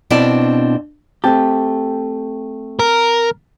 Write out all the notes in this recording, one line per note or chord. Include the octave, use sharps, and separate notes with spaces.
B2 C4 D4 E4 D5 A5
A3 C4 G4 G5 A5
A#4